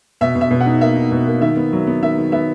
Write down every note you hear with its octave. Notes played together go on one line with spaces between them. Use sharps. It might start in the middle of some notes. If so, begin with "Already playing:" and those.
B2 E5
B2
E5
B2
F#5
D#4
A#3 E5
D#4
B2
A#3
D#3 E5
B3
F#3
B3
D#3 E5
D#3
B3 E5